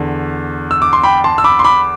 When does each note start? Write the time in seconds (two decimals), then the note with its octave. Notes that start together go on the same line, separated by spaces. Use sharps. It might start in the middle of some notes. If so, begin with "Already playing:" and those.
Already playing: E2 D3
0.71 E6
0.82 D6
0.93 C6
1.03 G5 B5
1.24 A5 C6
1.38 E6
1.44 B5 D6
1.59 C6
1.64 B5 D6